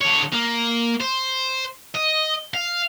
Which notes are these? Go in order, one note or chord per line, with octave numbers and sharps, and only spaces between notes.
D3 C#5
A#3
C5
D#5
F5